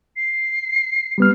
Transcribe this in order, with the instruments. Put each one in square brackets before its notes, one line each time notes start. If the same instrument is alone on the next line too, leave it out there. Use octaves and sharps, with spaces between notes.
[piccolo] C7
[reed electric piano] G3 B3 F6